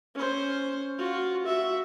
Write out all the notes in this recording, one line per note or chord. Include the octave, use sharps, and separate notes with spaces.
C#4 C5
F4 F#4
F#4 E5